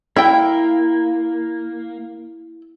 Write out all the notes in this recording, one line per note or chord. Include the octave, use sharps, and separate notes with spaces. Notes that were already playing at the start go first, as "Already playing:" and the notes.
A#3 E4 G5